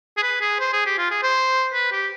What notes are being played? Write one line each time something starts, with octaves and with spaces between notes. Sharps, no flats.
G#4
B4
G#4
C5
G#4
G4
F4
G#4
C5
B4
G4